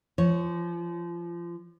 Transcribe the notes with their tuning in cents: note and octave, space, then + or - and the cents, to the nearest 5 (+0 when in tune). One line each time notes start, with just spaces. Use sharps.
F3 -25 C#5 +0